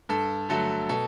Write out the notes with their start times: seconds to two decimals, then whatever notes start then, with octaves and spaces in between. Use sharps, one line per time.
0.09 G2 A4
0.49 D3 F#3 A3 A4
0.89 B2 A4